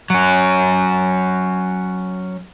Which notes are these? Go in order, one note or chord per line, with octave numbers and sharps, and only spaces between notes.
F#3 C#4